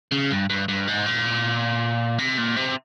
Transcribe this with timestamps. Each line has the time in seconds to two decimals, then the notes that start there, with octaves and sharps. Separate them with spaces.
0.12 C#3
0.31 G2
0.50 G2
0.68 G2
0.88 G#2
1.06 A#2
2.19 C3
2.38 A#2
2.56 C3